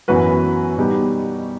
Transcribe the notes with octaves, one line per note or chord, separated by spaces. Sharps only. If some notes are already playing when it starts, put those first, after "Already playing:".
F#2 E3 B3 F#4 B4
B2 G3 B3 D#4 G4